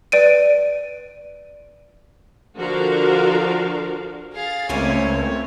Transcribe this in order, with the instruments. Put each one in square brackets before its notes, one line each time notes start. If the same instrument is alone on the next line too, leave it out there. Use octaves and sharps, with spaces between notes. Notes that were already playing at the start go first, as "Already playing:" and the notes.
[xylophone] B4 D5 D7 D#7
[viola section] D3 F3 D4 F#4 A#4 F5
[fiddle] G#4 F5 [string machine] A6
[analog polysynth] C#2 [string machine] A3 C4 [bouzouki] A#3 C#4 E4 [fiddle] C#5